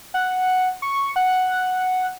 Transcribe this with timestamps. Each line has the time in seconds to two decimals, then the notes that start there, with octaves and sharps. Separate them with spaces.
0.14 F#5
0.82 C#6
1.16 F#5